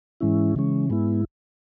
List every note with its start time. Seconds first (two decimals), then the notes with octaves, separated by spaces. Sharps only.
0.20 G#2 E3 G#3 C#4 E4
0.56 C#3 E3 G#3 C#4
0.90 G#2 G#3 B3 E4